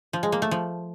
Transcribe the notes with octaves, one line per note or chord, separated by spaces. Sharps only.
F3
G#3
A#3
A3
F3